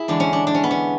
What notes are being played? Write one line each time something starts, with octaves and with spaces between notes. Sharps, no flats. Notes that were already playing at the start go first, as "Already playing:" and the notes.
Already playing: E4 G#4
E2 D3 G#3 D4
C#4
D4
D4
C#4
B3
C#4